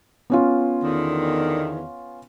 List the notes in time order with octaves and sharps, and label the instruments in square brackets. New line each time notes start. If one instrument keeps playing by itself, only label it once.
[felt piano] B3 C#4 F4
[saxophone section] E2 D3 D#3